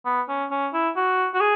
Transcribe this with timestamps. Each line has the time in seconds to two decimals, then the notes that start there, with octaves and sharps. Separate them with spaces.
0.06 B3
0.29 C#4
0.51 C#4
0.73 E4
0.96 F#4
1.34 F#4
1.40 G#4